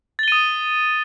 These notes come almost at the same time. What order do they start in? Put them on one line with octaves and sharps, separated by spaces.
A6 G7 D#7 D#6